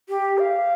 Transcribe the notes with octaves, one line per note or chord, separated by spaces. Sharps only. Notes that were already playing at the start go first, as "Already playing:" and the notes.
G4
F5